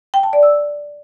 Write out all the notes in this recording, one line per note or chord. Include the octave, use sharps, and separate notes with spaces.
G5
A5
D5
E6